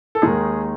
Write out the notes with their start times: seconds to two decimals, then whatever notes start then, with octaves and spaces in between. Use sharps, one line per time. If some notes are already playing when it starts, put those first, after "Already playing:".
0.15 A4
0.22 D#2 D#3 G#3 D#4 G#4